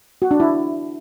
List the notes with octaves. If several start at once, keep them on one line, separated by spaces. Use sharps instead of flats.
F#4
D4
E4